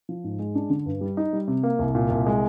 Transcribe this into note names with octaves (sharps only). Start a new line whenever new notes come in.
F3
G#2
G#3
D4
D3
G2
G3
D#4
G3
C3
A#3
C2
A#2
C2
G#3